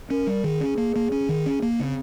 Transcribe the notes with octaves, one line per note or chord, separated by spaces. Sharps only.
C#4 A#4
G3
D#3 G#4
C#4
A#3
A#3
C#4
D#3
C#4
A#3
C#3 C4 D#4